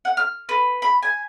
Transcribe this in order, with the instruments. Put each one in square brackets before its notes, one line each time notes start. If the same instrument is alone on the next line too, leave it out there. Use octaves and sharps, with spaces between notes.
[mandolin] F#5
F6
B4
B5
G#5